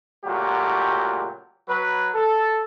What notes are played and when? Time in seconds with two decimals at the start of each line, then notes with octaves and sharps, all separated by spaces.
0.25 C#2 A#2 F#3 A3 F#4 G4
1.68 F#3 B4
2.14 A4